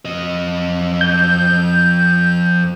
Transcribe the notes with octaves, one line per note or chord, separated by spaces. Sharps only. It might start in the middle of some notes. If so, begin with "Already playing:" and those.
F2 D#5
G6